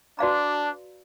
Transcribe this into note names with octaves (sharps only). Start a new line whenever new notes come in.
D4 F#4 B4 D5 F5 A#5